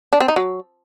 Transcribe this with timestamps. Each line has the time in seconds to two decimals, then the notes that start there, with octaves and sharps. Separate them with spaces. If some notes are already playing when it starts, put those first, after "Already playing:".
0.13 D4
0.20 C4
0.28 D#4
0.36 F#3